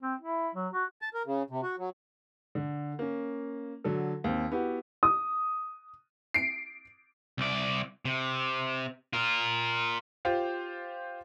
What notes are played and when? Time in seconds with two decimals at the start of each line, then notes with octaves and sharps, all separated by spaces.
0.02 C4
0.21 E4
0.55 F#3
0.73 F#4
1.02 A5
1.14 A#4
1.26 C#3
1.50 C3
1.63 F#4
1.78 F#3
2.55 D3
2.99 A#3 C#4
3.84 D3 F#3 A4
4.24 D#2 C4
4.52 B3 E4 F#4 G4
5.03 D#6
6.34 C7 D7
7.38 C2 D5
8.05 C3
9.13 F4 A#4
10.25 F4 G4 C5 F5